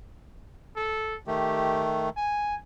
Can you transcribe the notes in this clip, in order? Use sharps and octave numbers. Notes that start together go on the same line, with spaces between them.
A4
D#3 A3 G4
G#5